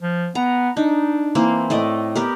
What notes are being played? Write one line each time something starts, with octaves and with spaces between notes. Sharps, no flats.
F3
B3 A#5
D4 D#4
E3 A#3 C4
A2 A3 D5 D#5
B3 G4 A#4